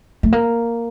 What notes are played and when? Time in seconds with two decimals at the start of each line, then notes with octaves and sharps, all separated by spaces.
0.23 A3
0.32 A#3